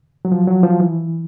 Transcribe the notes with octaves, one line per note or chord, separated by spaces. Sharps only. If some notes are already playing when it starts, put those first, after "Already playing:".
F#3
F3
F#3
F3
E3